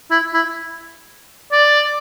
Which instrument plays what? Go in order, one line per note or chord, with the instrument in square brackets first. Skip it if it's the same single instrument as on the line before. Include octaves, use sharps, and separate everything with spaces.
[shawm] E4
E4
D5